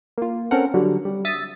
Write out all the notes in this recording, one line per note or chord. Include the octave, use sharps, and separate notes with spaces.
A#3 F4
C4 C#4 A4 A#4 F#5
D3 F#3 G3
G3
E5 D#6 A6 B6